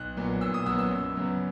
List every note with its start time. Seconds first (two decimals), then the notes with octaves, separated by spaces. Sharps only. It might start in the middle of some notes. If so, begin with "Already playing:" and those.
Already playing: B1 F#6
0.17 A#2 F#3 B3
0.41 B1 E6
0.54 D#6
0.66 A#2 F#3 B3 E6
0.79 E6
0.91 F#2
1.15 C#3 F#3 B3